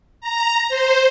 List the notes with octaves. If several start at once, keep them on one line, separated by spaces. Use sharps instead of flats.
A#5
C5